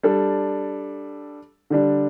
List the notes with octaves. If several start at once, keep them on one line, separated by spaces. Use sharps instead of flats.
G3 D4 A4
D3 G3 D4